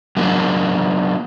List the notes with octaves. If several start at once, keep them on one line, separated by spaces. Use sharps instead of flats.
F#3 A#3 D4 D#4